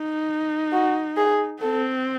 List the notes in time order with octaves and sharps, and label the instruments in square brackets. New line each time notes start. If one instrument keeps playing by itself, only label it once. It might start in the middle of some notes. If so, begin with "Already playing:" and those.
Already playing: [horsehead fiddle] D#4
[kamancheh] F#4
G#4
[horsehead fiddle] C4 [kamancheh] A4